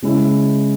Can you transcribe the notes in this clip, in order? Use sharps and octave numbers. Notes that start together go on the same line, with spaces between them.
C#3 G#3 E4